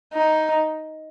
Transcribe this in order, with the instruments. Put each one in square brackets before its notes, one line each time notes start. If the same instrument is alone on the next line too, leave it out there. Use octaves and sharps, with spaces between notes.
[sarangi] D#4